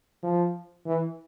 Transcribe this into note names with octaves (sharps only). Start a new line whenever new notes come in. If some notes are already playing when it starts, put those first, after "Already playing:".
F3
E3